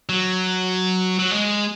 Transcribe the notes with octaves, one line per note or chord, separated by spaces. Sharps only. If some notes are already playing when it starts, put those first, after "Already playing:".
F#3
F#3
G#3